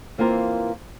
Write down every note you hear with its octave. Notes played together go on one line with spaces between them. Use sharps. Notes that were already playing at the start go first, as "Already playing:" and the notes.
E3 A#3 C4 F4 A#4